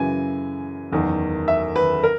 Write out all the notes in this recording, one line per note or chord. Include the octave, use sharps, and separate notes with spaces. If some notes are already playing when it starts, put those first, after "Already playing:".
Already playing: F#2 C#3 E3 G#5
F#1 E2 D#3
E5
B4
A#4